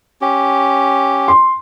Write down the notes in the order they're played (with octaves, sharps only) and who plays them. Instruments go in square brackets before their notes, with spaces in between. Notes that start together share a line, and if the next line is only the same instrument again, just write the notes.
[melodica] C#4 G4
[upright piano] C6